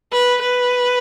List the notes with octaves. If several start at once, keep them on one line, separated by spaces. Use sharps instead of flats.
B4
B4